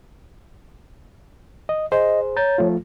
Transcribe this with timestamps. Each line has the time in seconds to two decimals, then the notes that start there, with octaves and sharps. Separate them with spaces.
1.69 D#5
1.92 G#4 C5 D#5
2.36 C#5 A#5 G6 A6
2.58 F3 A3 F4